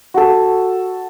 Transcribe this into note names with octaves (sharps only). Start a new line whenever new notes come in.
F#4 A4